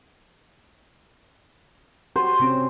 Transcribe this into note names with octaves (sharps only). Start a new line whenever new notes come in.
F#4 G4 C5
C3 C4 C#4